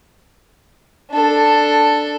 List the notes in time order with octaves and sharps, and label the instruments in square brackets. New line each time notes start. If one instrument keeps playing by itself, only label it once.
[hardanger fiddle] D4 A4